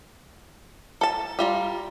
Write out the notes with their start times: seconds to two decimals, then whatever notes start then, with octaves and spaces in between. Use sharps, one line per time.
1.01 A4 A5
1.39 G3 F4 A#5